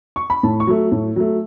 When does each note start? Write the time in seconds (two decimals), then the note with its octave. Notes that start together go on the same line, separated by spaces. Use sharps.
0.16 C#6
0.30 B5
0.43 A2 A5
0.60 C#6
0.67 F#3 A3
0.92 A2
1.16 F#3 A3